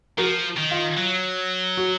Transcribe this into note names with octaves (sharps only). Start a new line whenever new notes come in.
F3 F#4 A#4
D#3
F4
F#3
F#4